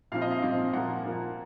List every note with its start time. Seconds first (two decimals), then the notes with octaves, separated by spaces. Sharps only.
0.12 A#2 F3 C4 F5
0.22 D#5
0.32 F5
0.42 A#2 F3 C4
0.73 A#2 F3 A#3 F#5
1.03 A#2 F3 A#3